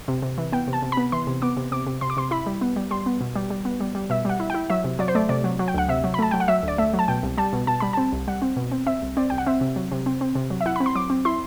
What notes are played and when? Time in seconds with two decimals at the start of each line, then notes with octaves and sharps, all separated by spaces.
0.08 C3
0.22 C3
0.38 E3
0.53 B3 G5
0.68 C3
0.73 A5
0.82 C3
0.92 B5
0.97 B3
1.12 E3 C6
1.27 C3
1.42 B3 D6
1.57 C3
1.72 C3 D6
1.87 C3
2.01 C3 C6
2.10 D6
2.17 C3 C6
2.31 E4 B5
2.46 G3
2.61 B3
2.76 G3
2.91 G3 C6
3.06 B3
3.21 B2
3.36 G3
3.50 G3
3.65 B3
3.80 G3
3.95 G3
4.10 B2 E5
4.25 G3 F#5
4.40 E4
4.50 G5
4.54 E4
4.70 F#3 E5
4.84 C3
4.99 F#3 D5
5.08 C5
5.15 A3 D5
5.29 C3 D5
5.44 F#3
5.59 F#3
5.68 G5
5.74 D2 F#5
5.89 C3 E5
6.04 F#3
6.14 B5
6.19 A3 A5
6.31 F#3 G5
6.40 F#5
6.48 F#3 E5
6.63 D2 D5
6.78 A3 E5
6.94 F#3
6.99 A5
7.08 B2 G5
7.23 C2
7.38 G3 A5
7.53 B2
7.67 B2 A5
7.80 G3 B5
7.93 C4 A5
8.13 C2
8.28 G3 F#5
8.42 C4
8.57 B2
8.72 C4
8.86 C4 E5
9.02 C2
9.17 C4 D5
9.30 C2 G5
9.38 F#5
9.46 C4 E5
9.61 C3
9.76 F#3
9.92 C3
10.06 C4
10.21 C4
10.35 C3
10.50 F#3
10.61 E5
10.66 E4 F#5
10.76 C4 B5
10.86 C6
10.95 F#3 D6
11.10 C4
11.25 E4 C6